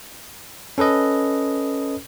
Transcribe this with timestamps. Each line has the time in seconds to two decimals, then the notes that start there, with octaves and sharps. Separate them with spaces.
0.78 C#4 A4 B4 D#5